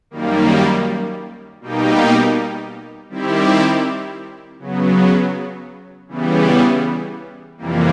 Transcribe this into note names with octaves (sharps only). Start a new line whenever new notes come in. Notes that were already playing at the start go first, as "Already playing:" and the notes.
F#2 D#3 G3 A#3
B2 G3 A#3 D#4 G4
D#3 G3 C4 E4 G4
C#3 F#3 B3
C#3 E3 G3 B3
F2 C3 E3 G3 A#3